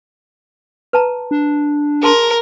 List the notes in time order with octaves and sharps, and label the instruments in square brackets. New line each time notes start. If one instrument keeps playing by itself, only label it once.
[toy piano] B4 A5 A#5
[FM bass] D4
[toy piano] G#4 A5 C6 [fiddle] A#4